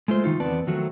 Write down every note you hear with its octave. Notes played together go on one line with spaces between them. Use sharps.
G#3 A3 F4 C5
D#3 D#4 F4
E2 B3 C4 B4 D5 A5
D#3 F3 F#3 A3 F#4